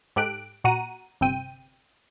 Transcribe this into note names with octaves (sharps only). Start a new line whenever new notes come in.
G#2 G4 A4 F#6 D7
A#2 F#4 F#5 A#5 D#7
G1 C3 C4 G5 D#7